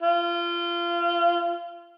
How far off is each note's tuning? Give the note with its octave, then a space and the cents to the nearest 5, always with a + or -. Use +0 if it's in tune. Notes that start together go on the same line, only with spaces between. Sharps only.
F4 -25